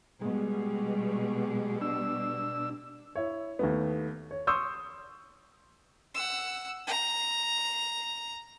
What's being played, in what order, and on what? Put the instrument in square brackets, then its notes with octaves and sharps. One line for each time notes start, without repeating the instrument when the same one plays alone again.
[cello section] B2 G3 [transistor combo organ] G#3
[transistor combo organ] D4 E6
[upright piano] E4 C#5
D#2 A3 B3
C#5
C6 C#6 D#6 E6 G6
[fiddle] F#5 E6
A#5